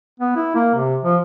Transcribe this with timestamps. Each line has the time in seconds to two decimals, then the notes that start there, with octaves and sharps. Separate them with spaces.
0.20 B3
0.36 E4
0.55 A#3
0.75 C3
1.04 F3